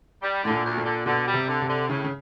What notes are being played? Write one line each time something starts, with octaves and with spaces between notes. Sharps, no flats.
G3
A2 D3
A#2
D2
A#2
D3
B2 D3
G3
C3
D3
C3
D3
A2 C#3
C#3